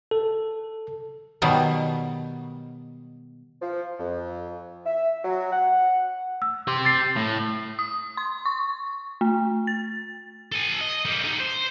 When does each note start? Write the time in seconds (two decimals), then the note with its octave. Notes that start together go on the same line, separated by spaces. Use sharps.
0.11 A4
1.42 B2 D#3 F#3 G3
3.62 F3
3.99 F2
4.86 E5
5.25 F#3
5.52 F#5
6.42 E6
6.68 G4 C6
6.85 A6 C7
7.17 A2
7.79 D#6
8.17 C6
8.46 C#6
9.21 A3
9.67 A6
10.52 A4 G#5
10.81 D#5
11.05 G3 A#3
11.23 D3 D#4
11.40 C5